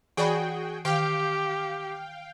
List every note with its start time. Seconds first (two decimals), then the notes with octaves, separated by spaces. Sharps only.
0.17 E3 F#4 G#4 D5 G5 B5
0.85 D#3 G4 F5 G5